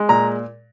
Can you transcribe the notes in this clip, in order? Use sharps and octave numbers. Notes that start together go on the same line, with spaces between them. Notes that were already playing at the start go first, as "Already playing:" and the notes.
Already playing: G#3
A#2 A#5